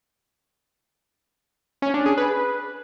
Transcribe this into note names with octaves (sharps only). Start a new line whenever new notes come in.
C#4
D4
G#4
B4